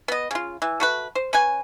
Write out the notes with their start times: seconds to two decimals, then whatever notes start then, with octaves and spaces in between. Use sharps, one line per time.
0.08 B3 D#5
0.31 C#3 F4
0.62 E3
0.80 A3 F#4 B4
1.15 C5
1.33 C#4 B4 G#5